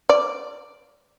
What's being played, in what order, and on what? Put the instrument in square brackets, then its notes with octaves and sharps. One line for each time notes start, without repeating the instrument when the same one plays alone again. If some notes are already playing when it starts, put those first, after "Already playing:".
[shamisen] D5